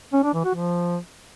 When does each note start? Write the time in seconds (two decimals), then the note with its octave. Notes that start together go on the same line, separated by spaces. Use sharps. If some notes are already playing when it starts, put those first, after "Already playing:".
0.13 C#4
0.23 D4
0.34 E3
0.44 F#4
0.55 F3